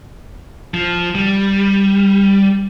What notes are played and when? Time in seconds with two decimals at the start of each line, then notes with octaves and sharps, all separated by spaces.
0.74 F3
1.15 G3